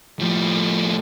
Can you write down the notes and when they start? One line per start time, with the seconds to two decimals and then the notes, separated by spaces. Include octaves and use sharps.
0.20 A2 F3